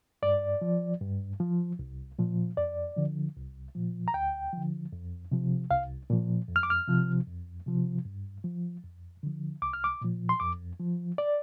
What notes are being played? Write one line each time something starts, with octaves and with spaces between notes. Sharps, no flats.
G2 D5
F3
G2
F3
C2
A#2 F3
F2 D5
D3 F3
C2
A#2 F3
A#5
D2 G5
D3 F3
F2
C3 F3
C2 F5
A#2 F3
F2
F6
D6
F6
C3 F3
F2
C3 F3
G2
F3
F2
D3 F3
C2 D6
F6
D6
A#2 F3
C6
F2 D6
F3
D5